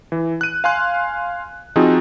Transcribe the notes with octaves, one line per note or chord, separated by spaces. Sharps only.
E3
F#6 D#7
F5 G#5 C6 F#6
F3 C4 D#4 F4 F#4 G#4